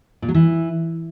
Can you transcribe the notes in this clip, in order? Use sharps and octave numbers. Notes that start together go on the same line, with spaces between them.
A#2
F#3
E3